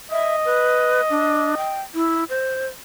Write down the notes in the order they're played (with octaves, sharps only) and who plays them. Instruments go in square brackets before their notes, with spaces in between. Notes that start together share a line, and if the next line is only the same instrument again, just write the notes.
[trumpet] D#5 [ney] E5
[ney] B4
D4
G5
E4
C5